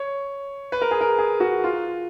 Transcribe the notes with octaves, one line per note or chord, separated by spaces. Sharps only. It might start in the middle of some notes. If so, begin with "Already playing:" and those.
Already playing: C#5
B4
A#4
G#4
A#4
G#4
F#4
F4